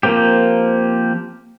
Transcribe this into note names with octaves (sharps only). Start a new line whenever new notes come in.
F3 A#3 C4 G4